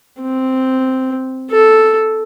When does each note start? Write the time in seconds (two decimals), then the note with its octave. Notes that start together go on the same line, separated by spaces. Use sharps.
0.22 C4
1.51 A4